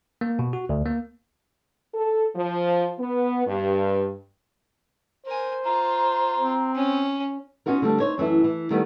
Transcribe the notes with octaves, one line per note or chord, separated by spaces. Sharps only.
A#3
B2
F#4
D2
A#3
A4
F3
B3
G2
A#4 C5 G#5
F4 A#5
C4
C#4
B3 C#4 D#4 F4 F#4 A#4
D3 G3 A3
D#4 C5 C#5
F#2 E3 A3 E4
E3
D#3 G3 A3 B3